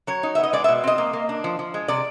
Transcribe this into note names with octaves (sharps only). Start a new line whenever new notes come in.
F#3 C#5
D#4
B3 E5
D#5
G#3 D5
E5
B2
C4 D#5
A#3
A#3
D4
F3
F3
G#3
C3 D5